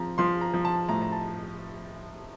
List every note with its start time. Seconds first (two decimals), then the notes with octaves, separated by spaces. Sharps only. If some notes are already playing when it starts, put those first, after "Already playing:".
Already playing: F3 C4 A#5
0.18 F3 C6
0.41 A#5
0.54 F3
0.65 A5
0.89 A2 A#5
1.02 A#5
1.12 A5